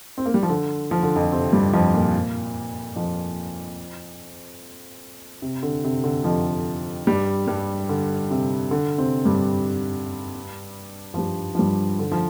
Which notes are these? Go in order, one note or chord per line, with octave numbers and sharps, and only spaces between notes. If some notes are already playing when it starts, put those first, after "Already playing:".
C4
A#3
G3
F3
D3
F3
D3
F2 F3
C3 C4
G2 G3
F2 F3
A#2 A#3
F2 F3
C3
D3
C3
D3
F2 F3
G2 G3
G2 G3
D3
C3
D3
C3 C4
G2 G3
F3
G2 G3
F3
G2 G3
D3
F3